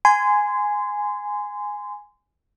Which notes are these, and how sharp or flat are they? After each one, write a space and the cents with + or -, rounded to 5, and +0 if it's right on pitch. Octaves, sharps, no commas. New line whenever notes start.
G#5 +0 C6 -25